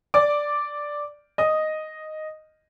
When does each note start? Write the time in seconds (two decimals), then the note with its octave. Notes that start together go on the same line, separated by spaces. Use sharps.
0.14 D5 D6
1.38 D#5 D#6